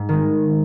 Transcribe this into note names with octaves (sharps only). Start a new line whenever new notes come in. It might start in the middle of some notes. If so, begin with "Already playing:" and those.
Already playing: G#2
D#3 G#3